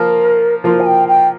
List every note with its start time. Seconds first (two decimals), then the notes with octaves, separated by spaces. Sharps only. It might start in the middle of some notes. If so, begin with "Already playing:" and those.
Already playing: F3 A#3 F4 A#4
0.63 F3 A#3 F4 C5
0.80 G#5
0.86 G5
1.08 G5